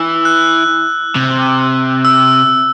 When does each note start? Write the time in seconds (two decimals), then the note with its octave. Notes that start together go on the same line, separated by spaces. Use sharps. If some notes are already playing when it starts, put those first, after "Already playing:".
Already playing: E3 E6
0.25 F#6
1.16 C3
2.05 E6